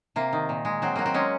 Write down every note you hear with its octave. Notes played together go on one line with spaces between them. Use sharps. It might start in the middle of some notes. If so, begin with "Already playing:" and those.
C3 A#3
D#3
A#2
G#3
F#3 C4
F#3 A#3
C4
G#3 C#4